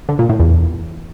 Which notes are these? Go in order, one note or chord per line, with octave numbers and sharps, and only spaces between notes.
D3
A#2
A2
E2